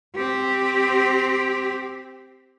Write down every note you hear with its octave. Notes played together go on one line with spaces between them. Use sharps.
C4 G4